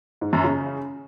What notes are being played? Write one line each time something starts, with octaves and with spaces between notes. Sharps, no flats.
G#2
F#2
C#3